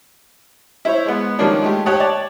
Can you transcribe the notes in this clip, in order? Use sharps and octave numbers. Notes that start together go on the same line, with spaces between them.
E4 C5 C#5
G#3 B3
D#3 F3 G3 A#3 C#4 D4
G#3 A3 G4
D#2 G4 C#5 F#5 A5 D#6
C#5 D5 A5